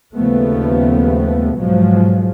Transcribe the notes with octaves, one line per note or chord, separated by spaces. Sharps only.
D#2 C#3 F3 G3 A3 B3
B1 G#2 B2 F3 F#3 G#3